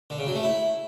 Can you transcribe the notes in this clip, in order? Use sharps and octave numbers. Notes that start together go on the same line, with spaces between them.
D3
C#3
F#3
A3
E4